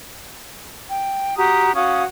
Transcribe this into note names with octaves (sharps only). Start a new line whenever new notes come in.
G5
F#4 G4 A#5 D#6
C#4 F#4 F5 D#6